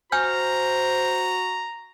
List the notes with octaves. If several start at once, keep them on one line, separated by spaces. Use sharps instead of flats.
F#4 C5 G#5 A#5 F6 G6